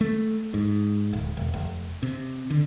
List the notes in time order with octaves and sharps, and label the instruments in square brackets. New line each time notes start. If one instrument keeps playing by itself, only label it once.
[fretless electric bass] A3
G#2
D1
E1
F1
C3
D3